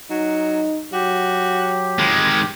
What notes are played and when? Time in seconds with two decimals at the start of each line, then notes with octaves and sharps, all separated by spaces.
0.10 F#3 D#4
0.93 F#3 F#4 G4
1.99 D#3 F3 G#3